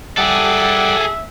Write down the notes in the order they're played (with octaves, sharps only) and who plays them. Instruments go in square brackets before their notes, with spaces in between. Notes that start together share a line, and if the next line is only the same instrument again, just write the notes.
[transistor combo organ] G3 D5 F#5 [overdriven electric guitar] G#4 A4 [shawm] E5